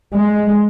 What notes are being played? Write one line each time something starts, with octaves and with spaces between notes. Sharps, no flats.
G#3